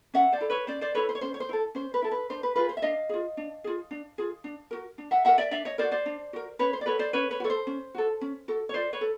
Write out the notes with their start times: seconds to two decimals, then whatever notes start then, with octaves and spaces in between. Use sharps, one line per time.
0.14 C#4 E5 F#5
0.32 C5 D5
0.41 E4 A4
0.50 B4 C#5
0.67 C#4 C5 D5
0.81 C5 D5
0.95 E4 A4 B4 C#5
1.09 C5
1.15 C#5
1.21 C#4 C5
1.34 C#5
1.40 C5
1.49 E4 A4
1.75 C#4 C5
1.94 B4
2.02 E4 A4
2.11 B4
2.30 D4 C5
2.43 B4
2.56 F4 G#4 B4
2.69 C5
2.77 E5
2.82 D4 D#5 F5
3.09 F4 G#4
3.37 D4
3.64 F4 G#4
3.91 D4
4.18 F4 G#4
4.44 D4
4.71 F#4 A#4
4.98 D4
5.11 E5 F#5
5.25 F#4 A#4 E5 F#5
5.38 D5 E5
5.51 D4 D5 E5
5.65 C#5 D#5
5.78 A#4 C5 D5
5.83 F#4
5.92 C5 D5
6.06 D4
6.33 F#4 A#4
6.59 C#4 B4 C#5
6.73 C5
6.81 D5
6.86 F#4 A4 B4 C#5
6.99 C5 D5
7.13 C#4 B4 C#5
7.31 B4 C#5
7.40 F#4
7.44 A4 C#5
7.50 C5
7.67 C#4
7.94 F#4 A4
8.21 C#4
8.48 F#4 A4
8.69 C#5
8.74 F4 C5 D5
8.93 B4 C#5
9.01 A4